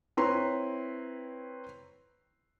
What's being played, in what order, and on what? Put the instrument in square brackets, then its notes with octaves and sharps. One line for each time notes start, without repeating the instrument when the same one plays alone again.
[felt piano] C4 E4 B4 C#5 A#5 C6